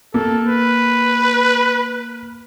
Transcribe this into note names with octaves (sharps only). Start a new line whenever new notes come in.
A#3 A4
B4